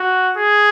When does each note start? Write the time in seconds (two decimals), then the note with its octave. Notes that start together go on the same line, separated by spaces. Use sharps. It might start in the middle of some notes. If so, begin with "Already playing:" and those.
Already playing: F#4
0.37 G#4